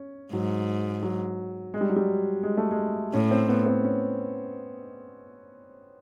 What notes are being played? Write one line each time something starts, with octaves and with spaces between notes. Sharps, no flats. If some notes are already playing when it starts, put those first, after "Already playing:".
Already playing: C#4
G#2 F#3
F#3
G#3
G3
F#3
G3
G#3
A3
G#3
A2 C#4
C4
B3
C4
C#4